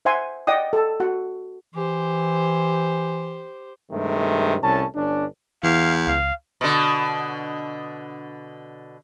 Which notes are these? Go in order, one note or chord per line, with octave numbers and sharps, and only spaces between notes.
C5 E5 F#5 G#5 C6
D5 D#5 F#5 G5 D#6
A4 A5
F#4 F#5
E3 G4 C5
G2 C3 D#3 G#3 A3
C2 A2 C#4 A5
G1 C#4 D4
E2 E3 F5
C#2 F5
B2 D3